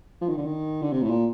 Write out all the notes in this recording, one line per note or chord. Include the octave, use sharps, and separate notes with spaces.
F3
D#3
D3
D#3
D3
C3
A2
A#2